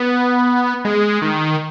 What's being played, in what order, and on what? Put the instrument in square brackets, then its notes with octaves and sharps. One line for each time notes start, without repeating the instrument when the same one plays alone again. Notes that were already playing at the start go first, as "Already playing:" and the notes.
Already playing: [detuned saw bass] B3
G#3
D#3